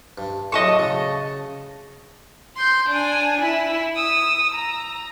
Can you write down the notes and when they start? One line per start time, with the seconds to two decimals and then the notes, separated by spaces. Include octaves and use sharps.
0.18 G2
0.52 A2 F#3 D#5 A5 C#6
0.79 C#3
2.56 C6 G6
2.89 D4 G#5
3.41 E4
3.96 D#6 E6
4.54 A#5